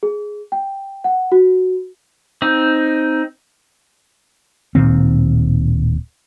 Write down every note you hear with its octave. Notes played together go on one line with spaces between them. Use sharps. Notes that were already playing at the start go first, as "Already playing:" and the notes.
G#4
G5
F#5
F#4
C4 D#4
D1 A#2 D#3 C4